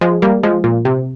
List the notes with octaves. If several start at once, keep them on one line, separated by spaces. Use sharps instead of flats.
F3 G#3
G3 A#3
F3 G#3
A#2
C3